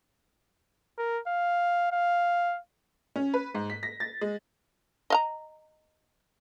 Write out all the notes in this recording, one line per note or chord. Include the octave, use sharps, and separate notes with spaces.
A#4
F5
F5
C#4
B4
G#2
B6
A#6
A6
G#3
D#5 F5 A#5